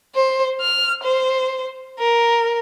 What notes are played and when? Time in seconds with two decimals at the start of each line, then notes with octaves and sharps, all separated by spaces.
0.15 C5
0.61 F6
1.03 C5
1.99 A#4